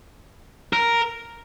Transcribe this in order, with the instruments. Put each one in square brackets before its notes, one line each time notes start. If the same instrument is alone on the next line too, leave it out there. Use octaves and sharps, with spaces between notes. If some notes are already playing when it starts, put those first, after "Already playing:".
[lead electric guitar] A#4